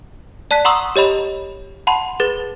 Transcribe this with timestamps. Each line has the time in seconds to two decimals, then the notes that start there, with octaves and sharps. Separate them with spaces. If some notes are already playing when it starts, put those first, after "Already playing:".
0.51 D5 A5 F#6 B6
0.65 F#5 A#5 C6 C#6 D#6 E6
0.96 G4 C#5 D#5 B5 E7
1.87 F#5 A5 B5 C6
2.20 G#4 B4 A6